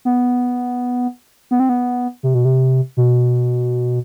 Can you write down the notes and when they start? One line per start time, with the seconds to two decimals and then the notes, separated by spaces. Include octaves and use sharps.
0.05 B3
1.51 B3
1.60 C4
1.69 B3
2.23 C3
2.35 B2
2.45 C3
2.97 B2